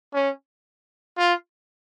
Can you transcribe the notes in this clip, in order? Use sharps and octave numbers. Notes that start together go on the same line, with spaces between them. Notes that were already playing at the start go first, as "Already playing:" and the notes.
C#4
F4